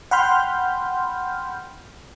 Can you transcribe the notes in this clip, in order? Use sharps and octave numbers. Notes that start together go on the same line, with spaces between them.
F#5 G5 B5 C6 F6 G6